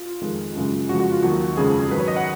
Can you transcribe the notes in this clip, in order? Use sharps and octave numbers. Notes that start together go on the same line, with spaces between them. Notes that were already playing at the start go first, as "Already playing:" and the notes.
Already playing: F4
F2 D#3 G#3
F#2 C#3 G#3
F2 C#3 F3 G#3 F#4
F#4
F4
D#2 D#3 F#3 F#4
F2 C#3 F3 G#3 G#4
G#2 D#3 F#3 B4
C#5
D#5
F#5